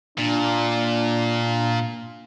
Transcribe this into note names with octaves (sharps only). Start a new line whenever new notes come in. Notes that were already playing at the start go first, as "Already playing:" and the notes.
A#2 D4